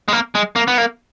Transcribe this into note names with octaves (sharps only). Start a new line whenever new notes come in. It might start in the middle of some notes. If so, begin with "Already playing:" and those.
G#3
A#3
G#3
A#3
B3
A#3